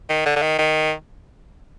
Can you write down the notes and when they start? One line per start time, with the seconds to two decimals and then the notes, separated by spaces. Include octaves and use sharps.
0.09 D#3
0.25 D3
0.36 D3
0.42 D#3
0.58 D#3